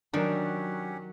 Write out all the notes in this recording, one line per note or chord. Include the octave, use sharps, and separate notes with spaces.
D#3 F#3 C#4 D4 G4 A#4 F#5